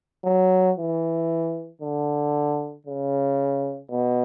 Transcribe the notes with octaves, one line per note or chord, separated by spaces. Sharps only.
F#3
E3
D3
C#3
B2